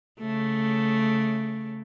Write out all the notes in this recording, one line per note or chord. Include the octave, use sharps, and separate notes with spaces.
C#3 A3